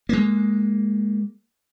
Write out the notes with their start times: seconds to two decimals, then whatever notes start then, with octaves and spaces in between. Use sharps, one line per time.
0.09 G#3 A#3